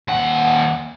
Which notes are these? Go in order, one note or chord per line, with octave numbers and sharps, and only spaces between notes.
D#2 F#5